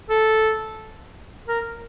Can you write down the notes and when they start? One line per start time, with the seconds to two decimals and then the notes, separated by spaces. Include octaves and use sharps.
0.10 A4
1.48 A#4